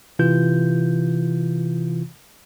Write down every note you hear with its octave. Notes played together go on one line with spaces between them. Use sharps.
C3 E3 F4 G6